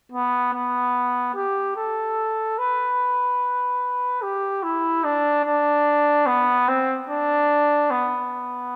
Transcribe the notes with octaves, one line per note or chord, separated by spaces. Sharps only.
B3
B3
G4
A4
B4
G4
E4
D4
D4
B3
C4
D4
B3